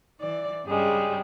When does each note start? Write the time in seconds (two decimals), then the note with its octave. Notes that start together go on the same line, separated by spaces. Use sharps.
0.18 E3 D5
0.66 G2 C#3 G3 G#3